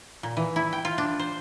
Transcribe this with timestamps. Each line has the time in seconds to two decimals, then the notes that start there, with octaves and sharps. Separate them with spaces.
0.23 A#2
0.37 E3
0.56 E4
0.73 G5
0.85 F4
0.98 D4
1.19 C5